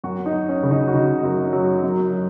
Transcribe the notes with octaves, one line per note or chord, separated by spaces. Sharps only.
F#2 F#4
D#4
F#2
C#4
C#3
D#4
F#4
C#3 D#4
F#2
F#3
F#2
F#3